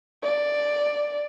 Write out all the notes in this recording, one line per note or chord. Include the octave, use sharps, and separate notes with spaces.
D5